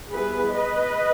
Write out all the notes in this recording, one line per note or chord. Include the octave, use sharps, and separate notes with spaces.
G3 B3 E4 G#4 B4
B4 D#5